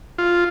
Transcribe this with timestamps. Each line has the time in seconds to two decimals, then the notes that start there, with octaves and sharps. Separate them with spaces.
0.18 F4